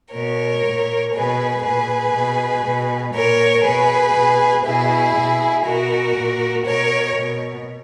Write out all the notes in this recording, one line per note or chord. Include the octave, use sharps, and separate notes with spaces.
B2 A#4 C#5
A#2
B2 G#4 B4
A#2 G#4 B4
B2
B2
A#2 A#4 C#5
B2 G#4 B4
B2
B2 E4 G#4
B2
B2 F#4 A#4
A#2
B2 A#4 C#5
B2